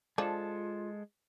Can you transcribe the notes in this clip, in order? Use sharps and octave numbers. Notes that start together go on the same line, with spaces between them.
F3 G#3 D4 F4 A4